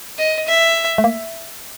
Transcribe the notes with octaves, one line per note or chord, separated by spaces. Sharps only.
D#5
E5
A3
A#3